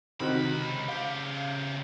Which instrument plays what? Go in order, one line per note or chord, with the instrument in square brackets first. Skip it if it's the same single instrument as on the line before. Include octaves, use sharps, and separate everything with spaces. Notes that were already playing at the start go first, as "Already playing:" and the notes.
[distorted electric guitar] C#2 B5 [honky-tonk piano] C3 D#3 F#4
[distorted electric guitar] C#3 G4 [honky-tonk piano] F5